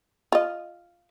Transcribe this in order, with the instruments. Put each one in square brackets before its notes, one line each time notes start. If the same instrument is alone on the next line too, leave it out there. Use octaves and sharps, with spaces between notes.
[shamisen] F4 D#5